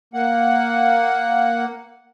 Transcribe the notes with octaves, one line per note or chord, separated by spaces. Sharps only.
A#3 F#5